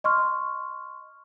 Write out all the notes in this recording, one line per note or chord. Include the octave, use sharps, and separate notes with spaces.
D#5 C6 C#6 F6